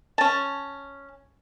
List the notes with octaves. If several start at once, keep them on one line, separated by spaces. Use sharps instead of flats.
C#4 A5